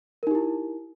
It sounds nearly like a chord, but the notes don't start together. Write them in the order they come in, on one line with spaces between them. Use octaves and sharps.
A#4 D#4 G4 E4